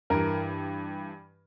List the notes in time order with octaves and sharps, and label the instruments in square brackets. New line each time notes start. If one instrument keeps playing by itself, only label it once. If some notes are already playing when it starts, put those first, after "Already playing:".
[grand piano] G2 E3 A#4